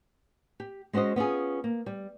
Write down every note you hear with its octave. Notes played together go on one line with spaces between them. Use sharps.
G4
G#3 C#4 F#4 C5 D#5
B3 C#4 F4 G#4
A#3
G3